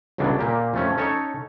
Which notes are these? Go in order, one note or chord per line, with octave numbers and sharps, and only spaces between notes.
G1 C#2 B2 F#3 D4
A#2 A#3 G4
F2 A3 C#4
C#4 D#4 A4 C#5